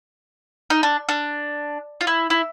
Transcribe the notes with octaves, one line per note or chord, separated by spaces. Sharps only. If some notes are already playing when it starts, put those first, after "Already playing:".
D#4
D4
D4
F4
E4
E4